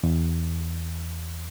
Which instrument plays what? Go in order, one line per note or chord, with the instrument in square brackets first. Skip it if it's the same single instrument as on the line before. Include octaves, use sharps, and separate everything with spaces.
[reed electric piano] E2